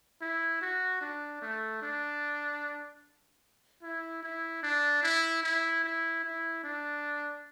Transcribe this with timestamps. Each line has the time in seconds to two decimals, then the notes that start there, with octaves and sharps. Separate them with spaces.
0.21 E4
0.62 F#4
1.01 D4
1.42 A3
1.82 D4
3.83 E4
4.23 E4
4.63 D4
5.03 E4
5.43 E4
5.84 E4
6.24 E4
6.64 D4